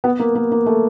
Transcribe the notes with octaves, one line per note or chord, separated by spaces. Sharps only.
B3
A#3
A#3
A#3
A3